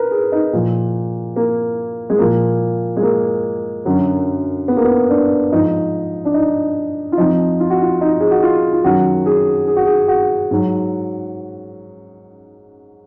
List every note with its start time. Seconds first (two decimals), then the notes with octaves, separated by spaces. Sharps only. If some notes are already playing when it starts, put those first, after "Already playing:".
Already playing: A#4 B4
0.11 G#4
0.32 D#4
0.53 A#2 F3
1.36 A#3
2.10 G#3
2.19 A#2 F3 A#3
2.97 G#3
3.03 A#3
3.85 F#2 D3 F#3
4.68 B3
4.77 A#3
4.85 B3
5.10 D4
5.52 G#2 F3 D#4
6.25 D4
6.34 D#4
7.12 F4
7.17 F2 F3 D#4
7.60 F4
7.70 F#4
7.82 F4
8.01 D#4
8.20 G#4
8.31 F#4
8.43 F4
8.73 F4
8.84 F#2 D#3 F#3 F#4
9.26 G#4
9.67 G#4
9.77 F#4
9.86 G#4
10.08 F#4
10.51 G#2 F#3